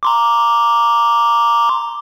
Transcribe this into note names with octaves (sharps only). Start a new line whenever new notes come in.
A#5 C6 D6